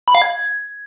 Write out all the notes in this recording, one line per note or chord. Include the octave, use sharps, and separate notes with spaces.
B5
F5
G#6